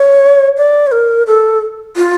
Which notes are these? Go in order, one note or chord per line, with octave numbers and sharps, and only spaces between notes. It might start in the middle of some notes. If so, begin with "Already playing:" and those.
Already playing: C#5
D5
C#5
A#4
A4
F4